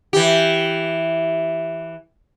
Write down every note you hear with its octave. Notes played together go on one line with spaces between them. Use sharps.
E3 G4